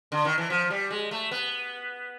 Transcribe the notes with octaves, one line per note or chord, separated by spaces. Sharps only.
D3
D#3
E3
F3
G3
G#3
A3
B3